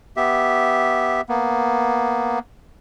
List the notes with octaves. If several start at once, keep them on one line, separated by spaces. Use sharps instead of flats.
B3 G4 E5
A#3 B3